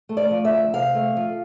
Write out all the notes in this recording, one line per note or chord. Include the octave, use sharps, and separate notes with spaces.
A3
D5
F3
E5
D2
C3 F5
A3
F3